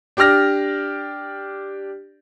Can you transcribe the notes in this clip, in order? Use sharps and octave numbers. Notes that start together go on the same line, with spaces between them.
D4 G4 D5 F6 A#6